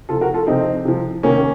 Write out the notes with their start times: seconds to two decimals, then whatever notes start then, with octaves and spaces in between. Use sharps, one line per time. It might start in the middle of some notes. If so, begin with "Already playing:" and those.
0.09 C3 F4 A4
0.12 F3
0.21 F#4 A#4
0.34 F4 A4
0.47 C3 F3 C4 D#4
0.85 C3 F3
1.23 C3 D#3 A#3 C#4